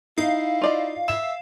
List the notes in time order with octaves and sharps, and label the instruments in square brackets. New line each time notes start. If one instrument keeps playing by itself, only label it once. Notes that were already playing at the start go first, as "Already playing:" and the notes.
[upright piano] D#4 [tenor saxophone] E4 [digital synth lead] F5
[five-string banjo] F4 D5 D#5
[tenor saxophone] E5 [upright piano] E7